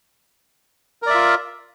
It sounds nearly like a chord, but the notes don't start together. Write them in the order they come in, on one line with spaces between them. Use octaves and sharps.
A#4 D5 E5 F4